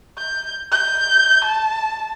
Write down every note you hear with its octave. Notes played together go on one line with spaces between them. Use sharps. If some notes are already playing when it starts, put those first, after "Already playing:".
G6
G6
A5